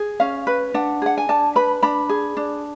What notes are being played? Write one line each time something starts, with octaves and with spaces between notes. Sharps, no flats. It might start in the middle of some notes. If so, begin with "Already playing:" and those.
Already playing: G#4
C#4 F5
B4
D4 F#5
G#4 F#5
G#5
D4 A5
B4 B5
D4 B5
G#4
D4